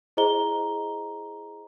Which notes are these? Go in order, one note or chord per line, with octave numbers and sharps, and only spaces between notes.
E4 G#4 C5 D#5 A#5 G7